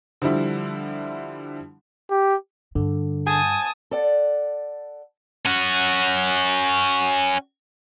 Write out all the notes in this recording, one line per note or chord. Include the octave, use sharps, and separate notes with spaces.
D3 F3 G3 E4
G4
G2 D3
G#5 A5 D#6
A4 D5 F#5
C#4 F#4